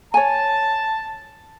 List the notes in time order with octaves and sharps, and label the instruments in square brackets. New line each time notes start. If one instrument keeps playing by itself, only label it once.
[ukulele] C#5 G#5 [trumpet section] A5